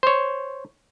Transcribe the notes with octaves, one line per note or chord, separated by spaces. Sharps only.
C5 C#5